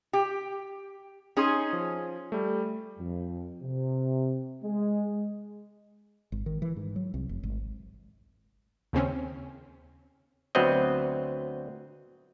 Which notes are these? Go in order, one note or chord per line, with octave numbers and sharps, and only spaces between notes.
G4
C#4 D#4 G#4 C6 D#6
F3
G3 A3
F2
C3
G#3
G#1
D#3
E3
G#2
F#3
C2
F1
G#1
D#2 C#3 C4 C#4
D2 F#3 B3 C4 D#5